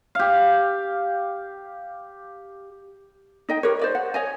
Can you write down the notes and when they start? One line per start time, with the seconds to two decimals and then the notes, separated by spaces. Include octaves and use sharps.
0.15 G4 F5
3.49 D#4 D#5 G5
3.63 G4 A#4 B4 C#5
3.79 C5 D5 D#5
3.95 F#5
4.14 C#5 D#5 G#5